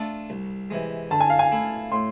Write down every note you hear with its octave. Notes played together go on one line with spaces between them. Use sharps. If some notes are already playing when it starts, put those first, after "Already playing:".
Already playing: A3 D4 F4 A4
C2
C3 E3 G#3
D3 A5
G#5
F5
G#5
A3 E4
A2 C6